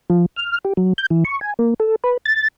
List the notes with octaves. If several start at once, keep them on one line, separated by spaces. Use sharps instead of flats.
F3
F6
G4
F#3
G6
E3
C#6
G#5
A#3
A4
B4
A6